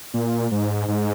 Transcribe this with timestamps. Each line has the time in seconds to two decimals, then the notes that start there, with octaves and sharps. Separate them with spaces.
0.14 A#2
0.51 G#2
0.88 G#2